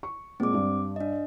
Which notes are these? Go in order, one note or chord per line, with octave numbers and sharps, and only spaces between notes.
C#6
A#2 G#3 C4 D6
G2
D4 D#5